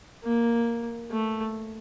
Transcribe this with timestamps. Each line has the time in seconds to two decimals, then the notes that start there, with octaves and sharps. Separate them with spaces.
0.23 A#3
1.11 A3